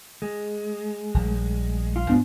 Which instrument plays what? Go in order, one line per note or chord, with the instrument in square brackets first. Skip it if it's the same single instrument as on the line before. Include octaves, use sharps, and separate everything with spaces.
[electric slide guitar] G#3
[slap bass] A#1 G3
[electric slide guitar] F4
[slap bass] G#2 B3 D4